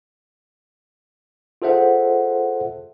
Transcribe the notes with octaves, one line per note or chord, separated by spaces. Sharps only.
F4 G#4 A4 C5 E5 F#5